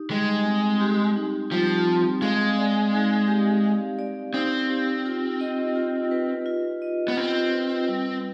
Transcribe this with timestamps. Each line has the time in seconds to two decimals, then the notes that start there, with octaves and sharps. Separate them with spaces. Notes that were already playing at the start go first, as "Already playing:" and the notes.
Already playing: D#4 G4
0.10 G3 G#3
0.45 C4
0.81 G4
1.16 D#4
1.51 F3 G3
1.87 C4
2.22 G#3 F5
2.58 D5
2.93 D#4
3.28 G4
3.64 F5
3.99 D5
4.34 C4 D#4
4.70 G4
5.05 F4
5.41 D#5
5.75 F4
6.11 B4
6.46 F4
6.82 D#5
7.08 B3
7.17 C4 F4
7.52 B4
7.88 G3